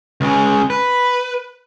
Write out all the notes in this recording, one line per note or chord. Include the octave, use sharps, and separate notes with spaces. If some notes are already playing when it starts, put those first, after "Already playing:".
C#2 C#3
B4